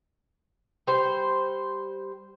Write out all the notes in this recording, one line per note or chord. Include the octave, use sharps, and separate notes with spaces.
G3 C5